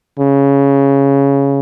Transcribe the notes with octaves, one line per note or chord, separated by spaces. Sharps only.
C#3